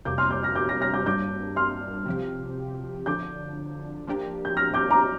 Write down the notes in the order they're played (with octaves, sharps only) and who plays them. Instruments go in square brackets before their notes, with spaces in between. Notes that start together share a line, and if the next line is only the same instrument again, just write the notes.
[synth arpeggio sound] F2 C3 G3 A#3 [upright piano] D6 G6
[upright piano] C6 F6
D6 G6
F6 A#6
D6 G6
F6 A#6
F6 A#6
D6 G6
[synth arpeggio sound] G2 G3 A#3 D4 [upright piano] D6 G6
[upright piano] C6 F6
[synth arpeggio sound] C3 F3 C4 G4
[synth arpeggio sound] D3 F3 D4 [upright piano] D6 G6
[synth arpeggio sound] F3 A#3 D4 G4 A#4
[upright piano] G6
F6 A#6
D6 G6
A#5 D6